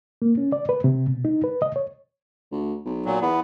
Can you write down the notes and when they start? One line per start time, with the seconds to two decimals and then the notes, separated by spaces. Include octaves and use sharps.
0.22 A#3
0.38 C#4
0.52 D5
0.69 B4
0.84 C3
1.07 B2
1.25 D#4
1.44 B4
1.62 D#5
1.76 C#5
2.52 D2
2.85 B1
3.05 A#2 F#3
3.22 E2 B3